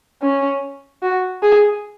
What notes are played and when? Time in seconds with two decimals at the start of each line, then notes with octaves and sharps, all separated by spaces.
0.22 C#4
1.02 F#4
1.42 G#4